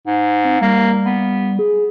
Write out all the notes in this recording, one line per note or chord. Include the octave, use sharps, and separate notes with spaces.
G#2
C4
G3 A#3
B3
G#4